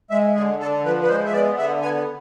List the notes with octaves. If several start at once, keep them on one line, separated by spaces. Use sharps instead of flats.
G#3 E5
D3 G#4
D3 A4
F3 B4
B4
G#3 C5
E5
B3 D5
D3 E5
B3 G#5